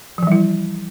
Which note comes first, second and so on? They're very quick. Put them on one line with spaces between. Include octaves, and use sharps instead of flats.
F3 E3 G3 E4